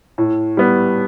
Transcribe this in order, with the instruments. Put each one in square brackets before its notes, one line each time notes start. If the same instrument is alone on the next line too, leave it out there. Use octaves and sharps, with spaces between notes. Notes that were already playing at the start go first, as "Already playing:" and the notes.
[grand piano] A2
G3 B3